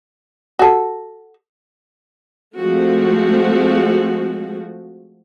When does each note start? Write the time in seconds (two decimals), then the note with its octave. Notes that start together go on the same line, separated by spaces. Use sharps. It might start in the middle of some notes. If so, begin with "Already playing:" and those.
0.59 F#4 A4
2.58 F3 G#3 A3 C4 F#4